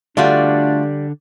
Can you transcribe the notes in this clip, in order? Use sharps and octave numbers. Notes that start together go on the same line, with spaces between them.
D3 G3 A3 D4 F4 F#4 D5